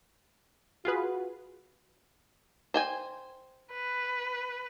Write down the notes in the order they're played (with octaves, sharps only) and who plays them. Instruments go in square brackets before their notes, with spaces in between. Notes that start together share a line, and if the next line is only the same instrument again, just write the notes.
[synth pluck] F4 G#4 B4 [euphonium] F#4
[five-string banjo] C5 G5 G#5
[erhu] B4